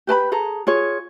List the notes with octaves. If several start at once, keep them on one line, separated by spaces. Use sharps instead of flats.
G4 B4 A5 B5
G#4 A4 A#5
F4 G#4 C#5